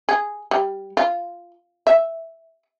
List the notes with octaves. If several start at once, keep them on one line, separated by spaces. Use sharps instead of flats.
G#4
G3
F4
E5